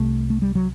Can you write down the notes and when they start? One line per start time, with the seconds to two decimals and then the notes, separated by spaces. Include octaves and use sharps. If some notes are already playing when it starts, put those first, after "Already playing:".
Already playing: C2 C3 A3
0.30 A3
0.42 G3
0.55 F#3